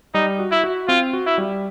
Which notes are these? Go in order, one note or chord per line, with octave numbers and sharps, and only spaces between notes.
G3 D#4
F#4
E4
F#4
C4 F4
F#4
E4
G3